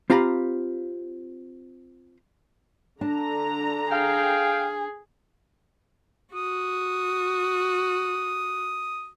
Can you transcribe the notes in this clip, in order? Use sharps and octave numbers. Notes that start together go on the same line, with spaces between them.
C4 F4 G4 F5 A#5 B5
D3 D4 A5 A#5
G#4 F5 G5
F#4 D#6